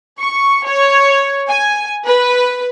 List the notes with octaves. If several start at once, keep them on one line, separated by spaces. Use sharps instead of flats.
C#6
C#5
G#5
B4